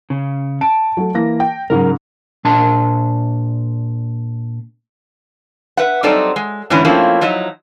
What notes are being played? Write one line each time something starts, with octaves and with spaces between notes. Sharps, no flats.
C#3
A5 D7
F#3 A3
E3 A#3 A#6
G5
G#2 C#3 F#3 A#4
A#2 D4 A5 C6
B4 E5 F#5
F#3 G3 C4 D#4 A4 D5
G#3
G#2 D3 E3 A3 C#4 E4
F3 A3 A#3 C4 C#4 E4
F3 F#3 D#4 E4 D#5